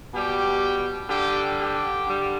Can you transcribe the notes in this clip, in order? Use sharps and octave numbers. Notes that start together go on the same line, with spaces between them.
B2 G3 G4
D3 G3 G4
G4
D3 G3